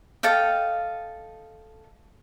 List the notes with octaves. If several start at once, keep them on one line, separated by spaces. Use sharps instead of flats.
A4 D#5 F5 G5